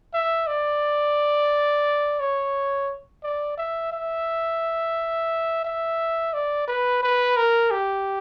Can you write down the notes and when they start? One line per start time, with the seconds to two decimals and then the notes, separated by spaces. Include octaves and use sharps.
0.14 E5
0.47 D5
2.20 C#5
3.23 D5
3.58 E5
3.92 E5
5.64 E5
6.34 D5
6.67 B4
7.03 B4
7.37 A#4
7.71 G4